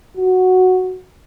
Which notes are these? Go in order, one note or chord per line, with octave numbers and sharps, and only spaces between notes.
F#4